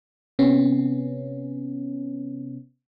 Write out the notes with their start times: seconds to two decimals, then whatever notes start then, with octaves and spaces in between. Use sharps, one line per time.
0.39 C3 B3 C#4